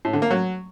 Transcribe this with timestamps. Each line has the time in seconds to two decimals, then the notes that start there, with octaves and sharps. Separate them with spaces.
0.05 A2
0.13 D3
0.22 A#3
0.31 F#3